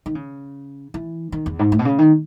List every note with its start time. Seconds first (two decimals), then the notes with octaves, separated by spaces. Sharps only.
0.06 D#3
0.15 C#3
0.94 E3
1.32 D#3
1.46 E2
1.59 G#2
1.72 A2
1.79 B2
1.85 C#3
1.99 D#3